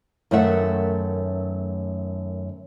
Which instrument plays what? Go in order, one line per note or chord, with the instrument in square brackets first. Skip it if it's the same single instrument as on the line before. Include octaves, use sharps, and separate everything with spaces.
[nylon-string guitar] F#2 D#3 A3 B4 E5 F#5